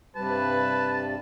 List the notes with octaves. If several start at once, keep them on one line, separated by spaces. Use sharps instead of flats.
G2 C3 G3 B4 A5